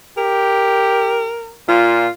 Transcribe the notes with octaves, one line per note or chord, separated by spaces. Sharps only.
G4 A#4
A#2 F4